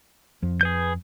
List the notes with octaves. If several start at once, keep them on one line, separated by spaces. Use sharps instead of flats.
F2 F3
G#4 B4 G6